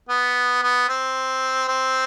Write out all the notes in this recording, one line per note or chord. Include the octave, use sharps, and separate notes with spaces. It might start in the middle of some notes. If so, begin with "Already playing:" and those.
B3
B3
C4
C4